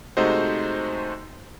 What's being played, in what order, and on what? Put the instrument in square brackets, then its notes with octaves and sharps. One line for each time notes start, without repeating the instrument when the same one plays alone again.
[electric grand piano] C3 G#3 A3 D#4 F#4 C5